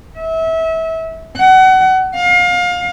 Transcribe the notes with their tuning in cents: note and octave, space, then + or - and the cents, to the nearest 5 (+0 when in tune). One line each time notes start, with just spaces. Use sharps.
E5 -25
F#5 +25
F5 +30